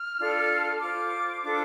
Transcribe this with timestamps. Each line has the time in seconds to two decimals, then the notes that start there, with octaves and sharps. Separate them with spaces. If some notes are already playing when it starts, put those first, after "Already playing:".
Already playing: F6
0.18 D4 F4 A4
0.80 F4 C5 D6
1.43 D4 F4 A4 C5 D6